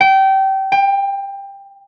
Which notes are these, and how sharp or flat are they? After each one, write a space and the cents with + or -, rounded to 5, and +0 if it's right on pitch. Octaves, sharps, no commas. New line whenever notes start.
G5 -25
G5 +20